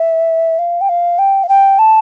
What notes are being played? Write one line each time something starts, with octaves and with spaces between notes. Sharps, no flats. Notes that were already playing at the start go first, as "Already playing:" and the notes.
Already playing: E5
F5
G5
F5
G5
F5
G5
A5